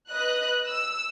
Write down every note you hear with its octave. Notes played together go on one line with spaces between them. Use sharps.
B4 D#5 F#6
E6